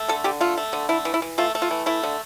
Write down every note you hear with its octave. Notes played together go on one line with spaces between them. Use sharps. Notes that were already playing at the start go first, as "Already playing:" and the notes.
Already playing: A3
D3 A4
D3 G4
A3 F4
A3
D3
A3 E4
E3
E4
E3
A3 F4
A3
F4
E3
A3 E4
D3